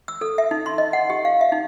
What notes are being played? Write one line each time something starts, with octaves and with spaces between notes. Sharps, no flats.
E6
A4
E5
D#4
C6
D#5
F#5
G4
F5
E5
D#4